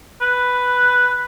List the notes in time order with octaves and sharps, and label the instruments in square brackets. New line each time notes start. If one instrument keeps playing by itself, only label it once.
[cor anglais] B4